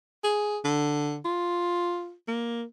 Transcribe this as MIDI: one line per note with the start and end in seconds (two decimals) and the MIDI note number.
0.24 0.58 68
0.64 1.18 50
1.25 2.13 65
2.28 2.63 58